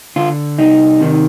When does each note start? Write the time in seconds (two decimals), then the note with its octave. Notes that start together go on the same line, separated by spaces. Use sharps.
0.16 D3 F4
0.58 C2 D#4
1.01 C3 D#3